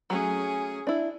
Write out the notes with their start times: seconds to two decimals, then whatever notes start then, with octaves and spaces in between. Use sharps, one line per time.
0.10 F#3 A3 C#4 G#4
0.87 D4 E4